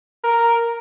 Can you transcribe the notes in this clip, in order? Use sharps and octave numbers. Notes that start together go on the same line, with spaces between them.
A#4